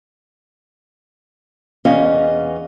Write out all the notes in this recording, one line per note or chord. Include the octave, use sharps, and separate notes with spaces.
E2 C#4 D#5 F5